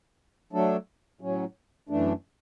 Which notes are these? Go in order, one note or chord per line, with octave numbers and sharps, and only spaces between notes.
F#3 A3 D4 A4
A2 F#3 C#4
F#2 E3 A3 D4